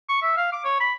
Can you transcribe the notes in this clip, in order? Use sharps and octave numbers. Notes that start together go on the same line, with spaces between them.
C#6
E5
F5
D6
C#5
B5